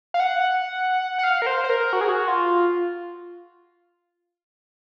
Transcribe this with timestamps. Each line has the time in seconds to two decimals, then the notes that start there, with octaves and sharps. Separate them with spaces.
0.14 F5
0.20 F#5
1.19 F#5
1.24 F5
1.42 A#4
1.47 C5
1.64 C5
1.70 A#4
1.93 F#4
2.01 G#4
2.09 F#4
2.28 F4